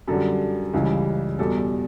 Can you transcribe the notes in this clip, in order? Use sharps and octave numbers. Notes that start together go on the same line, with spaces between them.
F#2 D3 G3 A4
C#2 C#3 E3 G3
E2 B2 G3 A4